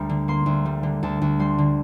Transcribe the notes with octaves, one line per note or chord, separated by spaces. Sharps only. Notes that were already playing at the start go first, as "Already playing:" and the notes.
Already playing: D2 G3 A#3 A#5
D3
A#3 C6
D2
G3
D3
D2 A5
D2
G3 C6
D3